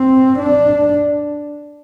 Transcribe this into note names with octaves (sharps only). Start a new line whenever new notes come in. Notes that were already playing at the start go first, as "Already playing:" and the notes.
Already playing: C4
D4